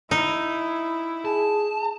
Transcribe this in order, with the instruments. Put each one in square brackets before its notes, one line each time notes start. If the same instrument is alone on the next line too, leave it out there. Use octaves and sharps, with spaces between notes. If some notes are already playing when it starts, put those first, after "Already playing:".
[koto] D#4 [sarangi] E4
[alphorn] G#4 [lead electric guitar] A5